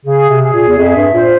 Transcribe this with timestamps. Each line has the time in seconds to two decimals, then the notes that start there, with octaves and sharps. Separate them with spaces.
0.05 C#3 G#4
0.29 C3
0.42 G#4
0.54 A#2
0.68 E2
0.78 F2 E5
0.96 G2
1.14 A#2 C5